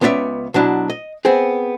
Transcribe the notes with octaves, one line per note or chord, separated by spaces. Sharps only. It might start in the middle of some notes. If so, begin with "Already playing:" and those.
C#2 B3 C#4 D5 E5
B2 F#3 D4 E4
D#5
B3 C4 G#4